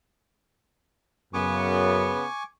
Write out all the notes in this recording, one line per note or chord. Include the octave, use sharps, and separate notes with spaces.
F#2 C#3 B3 G#5 C#6 D6